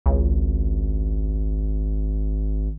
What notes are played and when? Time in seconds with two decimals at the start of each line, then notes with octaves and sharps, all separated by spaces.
0.06 G#1 C#2